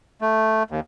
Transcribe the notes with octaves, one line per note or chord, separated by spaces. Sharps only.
A3
D#2